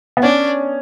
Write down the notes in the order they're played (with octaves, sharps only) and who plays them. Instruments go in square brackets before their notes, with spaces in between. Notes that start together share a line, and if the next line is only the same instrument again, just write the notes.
[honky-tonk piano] B3
[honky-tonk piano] C#4 [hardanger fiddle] D4